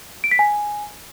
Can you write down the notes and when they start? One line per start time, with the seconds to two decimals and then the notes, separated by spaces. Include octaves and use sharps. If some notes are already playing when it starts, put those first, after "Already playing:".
0.24 D7
0.31 B6
0.39 G#5